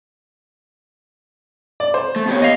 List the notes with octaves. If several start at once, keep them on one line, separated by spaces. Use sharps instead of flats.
D5
C5
A3
B3 G4 C#5
D#5 F5